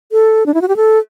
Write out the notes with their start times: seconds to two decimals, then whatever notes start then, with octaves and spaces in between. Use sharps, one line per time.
0.12 A4
0.46 D4
0.54 E4
0.62 F#4
0.68 G4
0.76 A4